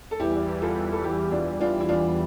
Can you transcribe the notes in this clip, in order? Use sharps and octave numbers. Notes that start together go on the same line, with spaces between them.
A4
E2 E3 G3 E4 G4
F4 A4
A4
E4 G4
D4 F4
D4 F4
E4
D4 F4